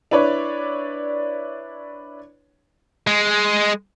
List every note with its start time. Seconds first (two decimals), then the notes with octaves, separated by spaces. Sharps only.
0.11 D4 E4 B4 C#5 D5
3.07 G#3